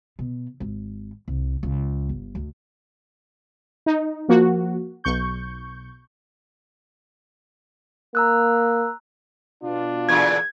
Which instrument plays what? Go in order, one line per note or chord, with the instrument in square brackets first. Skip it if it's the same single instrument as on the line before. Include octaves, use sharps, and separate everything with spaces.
[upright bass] B2
G#1
C2
C#2
G1
D2
[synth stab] D#4
F3 A#3 F#4
B1 C#6 G6
[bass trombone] A#3 [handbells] A#5 E6 F#6
[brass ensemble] B2 D4 F4
[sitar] E2 A#2 D3 [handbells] G#6